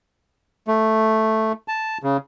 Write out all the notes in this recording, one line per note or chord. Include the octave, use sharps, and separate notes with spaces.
A3
A5
C#3